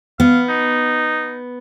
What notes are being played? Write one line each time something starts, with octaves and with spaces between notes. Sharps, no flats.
B3 F5
D#4